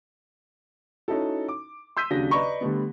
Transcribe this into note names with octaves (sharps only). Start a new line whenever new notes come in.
C#4 D#4 E4 F#4 A4
D6
C6 E6 G6 B6 D#7
D#2 C#3 F#3 D4 F#4 A#6
B4 D5 D#5 A#5 B5 C#6
D3 G3 A3 B3